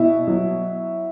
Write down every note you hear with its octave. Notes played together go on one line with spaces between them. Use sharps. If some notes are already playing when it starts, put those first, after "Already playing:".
Already playing: B2 E4
F#3